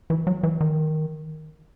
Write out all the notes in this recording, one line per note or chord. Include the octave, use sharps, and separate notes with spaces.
E3
F#3
E3
D#3